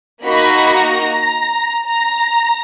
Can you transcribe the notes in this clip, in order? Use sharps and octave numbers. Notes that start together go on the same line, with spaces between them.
A#3 D#4 F#4 B5
A#5
A#5